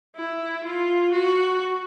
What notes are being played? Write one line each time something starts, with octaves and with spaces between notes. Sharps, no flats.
E4
F4
F#4